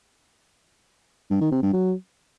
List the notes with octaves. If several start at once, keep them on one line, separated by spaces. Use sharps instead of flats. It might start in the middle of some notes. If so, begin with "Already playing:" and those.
G2
D#3
C3
G2
F#3